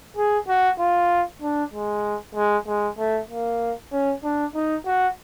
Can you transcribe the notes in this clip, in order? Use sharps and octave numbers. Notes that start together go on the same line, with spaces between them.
G#4
F#4
F4
D4
G#3
G#3
G#3
A3
A#3
C#4
D4
D#4
F#4